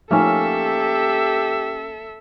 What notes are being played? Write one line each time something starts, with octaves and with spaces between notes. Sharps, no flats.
F3 A3 A#3 C#4 D#4 G4 A4 E5